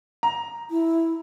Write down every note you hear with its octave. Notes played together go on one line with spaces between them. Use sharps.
A#5
E4